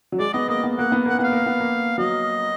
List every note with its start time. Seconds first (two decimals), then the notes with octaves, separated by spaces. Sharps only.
0.12 F#3
0.19 G#3 D5
0.33 B3 D#5
0.48 A#3 D#5
0.64 B3
0.78 A#3 F#5
0.92 B3
1.06 A#3 F#5
1.19 B3 F5 F#5
1.32 A#3
1.46 B3
1.60 A#3
1.98 F#3 D#5